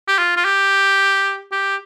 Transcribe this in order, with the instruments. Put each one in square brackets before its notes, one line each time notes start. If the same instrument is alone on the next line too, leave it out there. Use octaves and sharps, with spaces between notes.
[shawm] G4
F4
F4
G4
G4